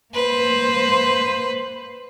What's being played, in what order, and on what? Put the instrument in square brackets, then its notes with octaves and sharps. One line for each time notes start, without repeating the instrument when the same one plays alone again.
[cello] A#3 C5 [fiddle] B4